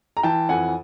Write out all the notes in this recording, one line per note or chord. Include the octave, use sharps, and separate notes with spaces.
A#5
E3 G5 A5
F2 F#5 G#5